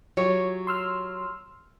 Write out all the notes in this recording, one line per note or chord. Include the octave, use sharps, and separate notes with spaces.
F#3 F4 G4 C#5
C6 E6 F6